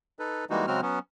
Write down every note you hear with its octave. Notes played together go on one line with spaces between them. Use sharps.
D#4 A4 B4
E3 G3 G#3 A#3 D#4 F#4
C#3 F#3 G#3 C4 F#4 F6
F#3 B3 C#4